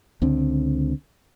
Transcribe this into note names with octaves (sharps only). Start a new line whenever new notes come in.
C#2 D3 C4